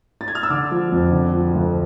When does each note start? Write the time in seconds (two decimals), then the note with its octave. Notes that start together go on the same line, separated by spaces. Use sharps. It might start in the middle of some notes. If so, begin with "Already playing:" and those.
0.21 A6
0.28 G#6
0.35 F6
0.43 E6
0.50 D3 D6
0.71 F3
0.92 F2
1.12 D3
1.33 F3
1.54 D2